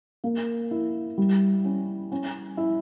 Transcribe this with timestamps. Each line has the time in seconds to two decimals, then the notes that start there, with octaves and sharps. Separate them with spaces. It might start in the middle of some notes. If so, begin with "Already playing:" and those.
0.24 A#3
0.71 E4
1.17 G3
1.65 C#4
2.12 C#4
2.57 E4